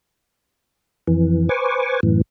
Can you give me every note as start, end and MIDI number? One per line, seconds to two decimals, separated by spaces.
1.07 1.49 41
1.07 1.49 52
1.49 2.00 71
1.49 2.00 72
1.49 2.00 80
1.49 2.00 85
1.49 2.00 86
2.03 2.21 42
2.03 2.21 45
2.03 2.21 52